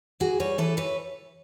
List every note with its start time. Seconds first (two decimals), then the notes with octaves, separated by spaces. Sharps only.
0.20 E3 F#4 G#4
0.40 G3 B4 C#5
0.58 E3 A4 B4
0.77 E3 B4 C#5